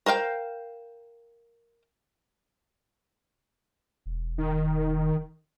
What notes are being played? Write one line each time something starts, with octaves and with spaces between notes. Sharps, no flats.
A#4 C5 F5 G5
E1
D#3